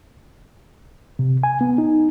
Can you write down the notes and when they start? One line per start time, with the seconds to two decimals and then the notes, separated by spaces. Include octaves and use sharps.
1.19 C3
1.43 G#5
1.61 B3
1.78 D#4